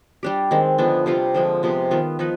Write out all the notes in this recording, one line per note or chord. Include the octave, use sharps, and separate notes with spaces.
G3 D4 G4
D#3 G#3 C4
D3 F3 B3 D4
C3 G3 C4 F4
D3 F3 G#3
C3 F3 B3
D#3 B3 F4
F3 B3 D#4 B4